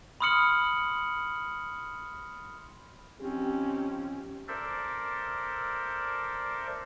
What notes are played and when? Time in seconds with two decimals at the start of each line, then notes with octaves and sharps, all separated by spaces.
0.21 B5 C6 D#6 F6 C#7 F#7
3.21 F3 C4 C#4 D#4 G4
4.48 A4 A#4 C5 D5 E5